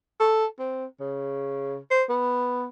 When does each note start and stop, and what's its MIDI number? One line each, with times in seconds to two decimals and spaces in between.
0.20 0.45 69
0.59 0.85 60
1.00 1.77 49
1.91 2.03 72
2.09 2.68 59